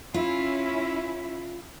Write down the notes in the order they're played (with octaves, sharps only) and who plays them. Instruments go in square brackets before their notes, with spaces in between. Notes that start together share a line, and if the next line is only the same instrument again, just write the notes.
[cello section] C#4 E4 [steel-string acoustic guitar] F4